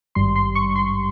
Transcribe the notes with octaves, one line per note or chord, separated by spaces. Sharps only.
G#1 G2 G3 C6
C6
C#6
C6